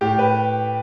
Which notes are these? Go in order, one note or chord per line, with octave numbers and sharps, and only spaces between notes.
A2 G4
B4